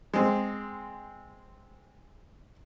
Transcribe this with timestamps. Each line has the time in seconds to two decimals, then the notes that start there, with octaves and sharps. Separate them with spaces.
0.14 G#3 C4